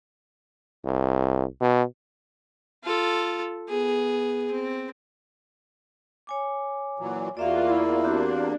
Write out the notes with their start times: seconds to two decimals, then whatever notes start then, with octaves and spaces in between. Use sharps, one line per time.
0.85 C2
1.60 B2
2.84 F4 A4
3.69 B3 G#4
4.50 C4
6.27 C#5 G#5 D6
6.99 A#2 E3 F#3
7.37 E2 A#3 F4 F#4 D5 E5 F5
7.66 E4
8.04 C4 D4 F#4 G4